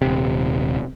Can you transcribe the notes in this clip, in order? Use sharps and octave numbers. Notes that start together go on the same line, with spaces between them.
D#1 C3